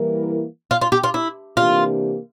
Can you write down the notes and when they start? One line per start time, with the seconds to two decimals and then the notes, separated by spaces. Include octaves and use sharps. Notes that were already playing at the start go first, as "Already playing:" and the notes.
Already playing: E3 G3 A#3 E4 A#4
0.71 F4
0.81 F4
0.92 G4
1.04 F4
1.14 E4
1.57 C3 E3 A#3 D4 F4 G4